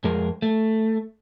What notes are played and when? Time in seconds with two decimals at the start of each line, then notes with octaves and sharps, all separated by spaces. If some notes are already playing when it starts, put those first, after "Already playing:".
0.04 F2 G#3 G#4 A#4
0.42 A3